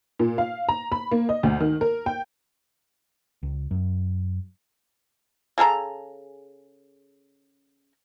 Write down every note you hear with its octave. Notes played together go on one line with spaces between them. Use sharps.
A#2
F5
A#5
B5
A#3
D#5
D2
D#3
A#4
G5
C#2
F#2
C#3 G#4 A4 A#5